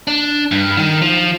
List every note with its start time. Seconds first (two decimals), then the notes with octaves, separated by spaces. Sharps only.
0.07 D4
0.52 G2
0.77 D#3
1.02 F3